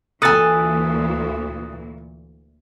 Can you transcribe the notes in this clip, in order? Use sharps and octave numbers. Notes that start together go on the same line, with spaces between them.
D2 A#2 E3 A4 G#5 D#6 F#6 A6